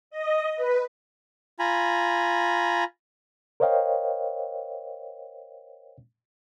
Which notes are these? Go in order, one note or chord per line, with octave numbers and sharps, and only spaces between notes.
D#5
B4
F4 G#5 A#5 B5
A#4 C5 C#5 D#5 F5 G5